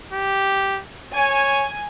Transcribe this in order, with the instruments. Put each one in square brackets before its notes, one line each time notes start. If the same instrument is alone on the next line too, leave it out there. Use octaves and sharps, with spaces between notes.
[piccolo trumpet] G4
[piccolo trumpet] C#5 [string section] G#5